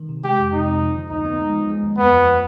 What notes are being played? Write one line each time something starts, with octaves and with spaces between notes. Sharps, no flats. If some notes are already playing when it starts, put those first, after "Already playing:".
Already playing: D#3
C3
G#3 G4
F2
C3 D#4
F2
F3
D3
D2 D#4
B3
G#3
F3
G#3
D#2
F2 B3
F3